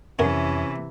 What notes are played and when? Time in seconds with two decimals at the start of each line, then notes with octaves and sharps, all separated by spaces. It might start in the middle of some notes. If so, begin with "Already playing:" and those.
0.19 F2 C3 E3 B3 C#4 E4 A#4